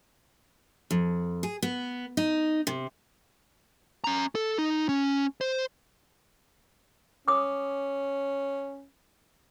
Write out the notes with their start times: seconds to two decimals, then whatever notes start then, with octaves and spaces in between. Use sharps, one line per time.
0.91 F2
1.43 G#4
1.62 B3
2.17 D#4
2.67 C3
4.04 C#4 A#5
4.35 A4
4.58 D#4
4.89 C#4
5.41 C5
7.28 C#4 D6 D#6